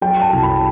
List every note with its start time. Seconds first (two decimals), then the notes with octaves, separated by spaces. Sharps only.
0.01 F#3 G5
0.22 A5
0.32 C2
0.43 B5